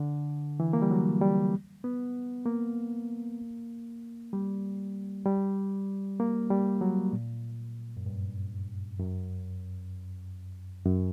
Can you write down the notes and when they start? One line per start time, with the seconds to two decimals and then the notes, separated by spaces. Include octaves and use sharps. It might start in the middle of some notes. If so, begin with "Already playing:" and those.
Already playing: D3
0.60 E3
0.73 A#3
0.82 G3
0.91 F#3
1.22 G3
1.84 B3
2.46 A#3
4.33 G3
5.26 G3
6.20 A#3
6.50 G3
6.81 F#3
7.13 A#2
7.97 F#2
8.06 G2
8.99 F#2
10.86 F#2